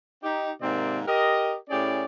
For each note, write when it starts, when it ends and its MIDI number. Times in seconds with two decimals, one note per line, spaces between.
0.22 0.50 63
0.22 0.50 67
0.60 1.01 44
0.60 1.01 48
0.60 1.01 51
0.60 1.01 58
0.60 1.01 60
0.60 1.01 74
1.06 1.55 67
1.06 1.55 70
1.06 1.55 75
1.69 2.05 45
1.69 2.05 61
1.69 2.05 64
1.69 2.05 67
1.69 2.05 68
1.69 2.05 74